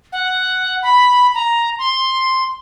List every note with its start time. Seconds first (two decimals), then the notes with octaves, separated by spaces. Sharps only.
0.12 F#5
0.83 B5
1.34 A#5
1.79 C6